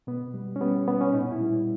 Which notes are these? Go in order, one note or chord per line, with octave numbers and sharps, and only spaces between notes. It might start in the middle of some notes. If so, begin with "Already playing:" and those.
B2 B3
G3
C#4
G3 B3
B2 B3
C#4
A#2 D#4
E4
G3